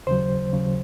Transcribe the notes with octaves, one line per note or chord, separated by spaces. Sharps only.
D#2 C#3 F#3 C5
D#2 C#3 F#3